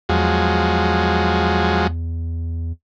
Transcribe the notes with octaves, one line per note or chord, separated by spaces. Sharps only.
E2 F3 F#3 G#3